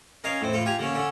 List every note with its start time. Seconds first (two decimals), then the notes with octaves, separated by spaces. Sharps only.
0.24 C#4 A#4 D#5 F5 G#5 A5
0.41 A2 C4
0.53 A2 F4 A4
0.65 F4 G4 G#5 A#5
0.79 D3 A#3 C#4
0.94 D3 C#4 D4